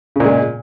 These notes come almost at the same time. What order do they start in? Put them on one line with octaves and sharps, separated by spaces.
C#3 A#2 G#3